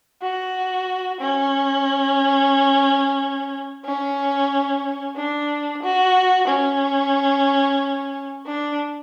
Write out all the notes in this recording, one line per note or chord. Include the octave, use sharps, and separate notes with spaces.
F#4
C#4
C#4
D4
F#4
C#4
D4